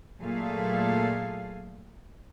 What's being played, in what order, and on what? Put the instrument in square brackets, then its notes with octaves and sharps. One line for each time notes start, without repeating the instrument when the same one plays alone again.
[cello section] A#2 F#3 A3 G#4 A4 F5